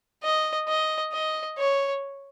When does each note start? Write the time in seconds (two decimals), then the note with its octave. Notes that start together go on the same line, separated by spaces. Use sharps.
0.23 D#5
0.68 D#5
1.13 D#5
1.58 C#5